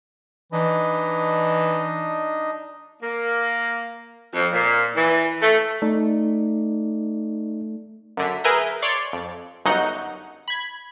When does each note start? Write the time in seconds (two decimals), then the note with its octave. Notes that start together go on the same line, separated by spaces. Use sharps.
0.53 E3 D4 D#4 D#5
3.02 A#3
4.34 F2
4.53 A#2
4.96 E3
5.42 A3
5.82 A3 D#4 D5
8.17 F#2 D3 B6
8.44 G#4 A#4 B4 E5 A#5 G6
8.82 C#5 D5 C6
9.13 F2
9.65 G1 F#2 F#3 D#4 F#5 G6
10.48 B5 G#6